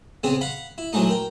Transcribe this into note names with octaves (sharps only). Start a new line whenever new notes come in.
C#3 B3 C4 G#4
F5 F#5 B5
E4
E3 F#3 G#3 A3 D#4
A#4 G5